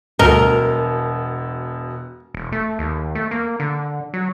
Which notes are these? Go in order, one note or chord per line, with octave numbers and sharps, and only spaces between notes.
E1 D2 B2 A#4 D#5
E1
A3
D#2
A3
A#3
D3
F#3